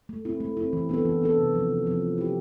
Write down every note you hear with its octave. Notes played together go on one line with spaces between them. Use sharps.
A3
C4 E4
A3
C4 E4
E3
B3 D4 A4
E3
B3 D4 A4
C3
F3 C4
C3
F3 C4
A3
E4 G4